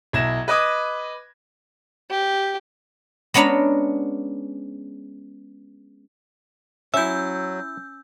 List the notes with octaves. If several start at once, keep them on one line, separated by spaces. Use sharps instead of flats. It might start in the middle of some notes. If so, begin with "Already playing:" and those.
B1 E4 G#6 A#6 E7
B4 D#5 B5 D6 D#6 G#6
G4
G#3 B3 C#4 D4 A#5 B5
F#3 C#4 E4 E5 E6 G6